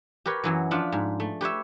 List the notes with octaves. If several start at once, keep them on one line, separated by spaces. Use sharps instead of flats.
G4 A#4 B4 C#5
F#2 E3 F#3
F3 D4 F4 F#5 B5
G#2
A3
G4 B4 C#5 E5